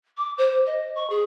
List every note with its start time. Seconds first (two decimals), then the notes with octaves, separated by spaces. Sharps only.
0.17 D6
0.38 C5
0.66 D#5
0.95 C#6
1.10 G#4